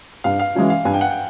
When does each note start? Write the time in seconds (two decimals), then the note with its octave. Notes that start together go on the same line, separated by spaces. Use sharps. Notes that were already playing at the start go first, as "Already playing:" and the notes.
0.24 G2 F5
0.39 F5
0.55 E3 G#3 C#4 F#4
0.70 F5
0.85 G2 G#5
0.94 G5
1.01 F#5
1.10 G5